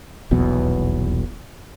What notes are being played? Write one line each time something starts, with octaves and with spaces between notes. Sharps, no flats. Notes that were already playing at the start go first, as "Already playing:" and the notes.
D#1 B1 E2 B2